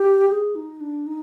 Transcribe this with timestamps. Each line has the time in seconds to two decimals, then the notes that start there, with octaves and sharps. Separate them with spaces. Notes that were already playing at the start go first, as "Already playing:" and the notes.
Already playing: G4
0.29 G#4
0.55 D#4
0.81 D4
1.07 D#4